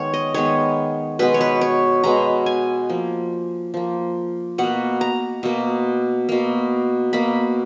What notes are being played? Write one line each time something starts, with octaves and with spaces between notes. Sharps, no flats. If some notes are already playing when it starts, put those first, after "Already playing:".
Already playing: D#3 G#3 B3 C#5
D#5
D#3 G#3 B3 C#5
B2 G#3 B3 B4
C#5
B4
C#5
B2 G#3 B3 A#5
G#5
F3 A#3
F3 A#3
B2 A#3 F#5
A#5
B2 A#3
B2 A#3
B2 A#3 B5